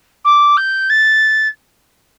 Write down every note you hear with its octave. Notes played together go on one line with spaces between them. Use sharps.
D6
G6
A6